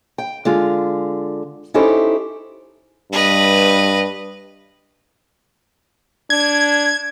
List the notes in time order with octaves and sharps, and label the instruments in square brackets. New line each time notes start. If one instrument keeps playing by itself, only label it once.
[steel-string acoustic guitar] G5
D3 G#3 F4
C#4 D#4 E4 G4 A4 C5
[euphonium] G2 [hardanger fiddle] B4 D#5
[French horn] D4 [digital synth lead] G#6